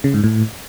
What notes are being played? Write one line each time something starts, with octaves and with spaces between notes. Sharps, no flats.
C#3
G#2
A2